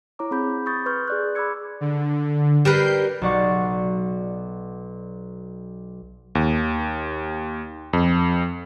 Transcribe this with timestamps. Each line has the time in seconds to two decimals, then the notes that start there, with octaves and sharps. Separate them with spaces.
0.19 E4 C#5 A#5 D6
0.31 C4 G#4 B5 G6
0.66 B5 C#6 D#6 G6 A6
0.86 B4 C6 C#6 F6 G6
1.08 G#4 D5 F#6
1.35 B5 C6 D6 E6 G#6 C#7
1.81 D3
2.65 G3 A#4 B4 G6 C7
3.22 B1 F#4 D5 F#5 C#6 C7
6.35 D#2
7.93 F2